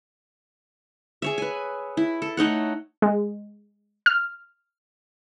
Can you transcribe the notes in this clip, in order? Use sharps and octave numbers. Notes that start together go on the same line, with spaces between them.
G#4 C#5 E5
B4 G#5
E4
A4
A3 D#4 C#5 F#5
G#3
F6